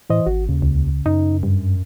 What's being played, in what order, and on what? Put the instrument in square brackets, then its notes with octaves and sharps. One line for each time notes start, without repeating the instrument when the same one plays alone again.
[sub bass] A2 [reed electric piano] E3 C5 D#5
[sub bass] G#1 [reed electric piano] F#4
[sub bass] D#2 [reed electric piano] C#3
[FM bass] C#2
[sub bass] F#2 [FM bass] D#4
[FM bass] G2